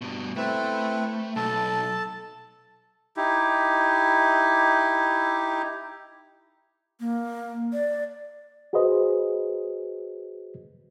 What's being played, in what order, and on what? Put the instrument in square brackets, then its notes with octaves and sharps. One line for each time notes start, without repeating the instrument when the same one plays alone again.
[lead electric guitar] G2 B2
[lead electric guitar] A3 [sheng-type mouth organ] C4 E4 B4
[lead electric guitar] B1 [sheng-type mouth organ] A4 A5
[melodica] D#4 E4 G4
[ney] A#3
D5
[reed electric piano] F#4 G#4 B4 C5 D#5